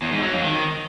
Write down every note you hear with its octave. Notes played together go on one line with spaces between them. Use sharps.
E2
G#2
F#3
F2
D#3